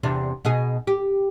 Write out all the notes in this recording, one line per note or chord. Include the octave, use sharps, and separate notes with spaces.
E2 C3 D4
B2 D#4 G#4
G4